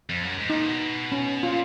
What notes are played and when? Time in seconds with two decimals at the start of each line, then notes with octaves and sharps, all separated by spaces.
0.09 F2
0.23 F#2
0.38 G#2
0.50 A#2 D#4
0.66 B2
1.12 C#4
1.43 A#2 F4